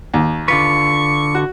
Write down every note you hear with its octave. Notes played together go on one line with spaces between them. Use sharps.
D#2
D3 F4 B4 C#6
F#4